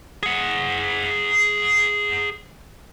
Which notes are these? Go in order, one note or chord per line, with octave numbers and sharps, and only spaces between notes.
G#4 F#5